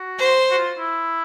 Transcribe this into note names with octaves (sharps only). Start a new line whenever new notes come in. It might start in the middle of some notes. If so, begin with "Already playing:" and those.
Already playing: F#4
C5
F#4
F4
E4